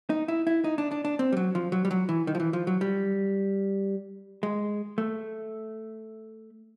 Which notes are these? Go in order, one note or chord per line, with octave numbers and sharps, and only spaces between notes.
D#4
E4
E4
D#4
D4
D4
D4
C4
G3
F#3
F3
F#3
G3
F#3
E3
D#3
F3
E3
F3
F#3
G3
G#3
A3